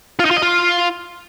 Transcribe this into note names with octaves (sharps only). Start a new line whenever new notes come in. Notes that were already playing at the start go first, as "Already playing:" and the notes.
F4
D#4
F4
D#5
F4